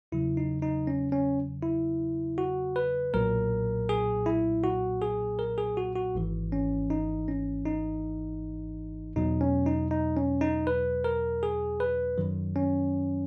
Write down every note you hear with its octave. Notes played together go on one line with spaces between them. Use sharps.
E2 C#3 F#3 E4
D#4
D#4
C#4
C#4
E4
F#4
B4
B1 A#2 F#3 A#4
G#4
E4
F#4
G#4
A#4
G#4
F#4
F#4
G#1 G#2 E3
C#4
D#4
C#4
D#4
E2 B2 F#3 D#4
C#4
D#4
D#4
C#4
D#4
B4
A#4
G#4
B4
F#2 D#3 F#3
C#4